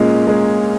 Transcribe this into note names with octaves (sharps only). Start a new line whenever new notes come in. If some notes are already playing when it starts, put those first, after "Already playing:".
Already playing: A#2 G#3 A#3 C#4
G#3